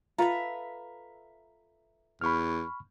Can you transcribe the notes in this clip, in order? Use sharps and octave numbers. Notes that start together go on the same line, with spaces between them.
F4 A4 B4 E5 A#5
E2 B5 C#6 F6